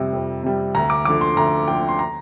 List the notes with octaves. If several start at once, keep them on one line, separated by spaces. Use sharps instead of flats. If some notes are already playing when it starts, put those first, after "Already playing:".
Already playing: F2 C3 G3
F2
C3 G3
D2 A#5
D6
D3 F3 D6
C6
D2 A#5
D3 F3 G5
C6
A#5